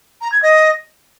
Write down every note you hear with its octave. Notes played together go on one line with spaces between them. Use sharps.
A#5
G#6
D#5